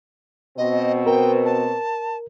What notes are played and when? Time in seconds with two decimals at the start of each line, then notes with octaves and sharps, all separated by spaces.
0.58 B2 C4 D#5
1.07 A#4 G5
1.45 A5